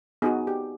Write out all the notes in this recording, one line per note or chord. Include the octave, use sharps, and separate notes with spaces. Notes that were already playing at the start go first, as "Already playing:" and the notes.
B3 D#4 F#4 G#4
G4